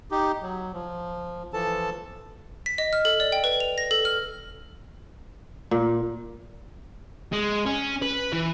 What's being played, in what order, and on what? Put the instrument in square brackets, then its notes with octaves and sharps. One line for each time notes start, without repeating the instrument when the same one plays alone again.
[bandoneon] D#4 G4
F#3
F3
E3 F3 A4 A5
[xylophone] B6
D#5
F6
A4
D5
G5
B4
F7
A#6
A4
F6
[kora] A#2
[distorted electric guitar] G#3
C#4
B4
E3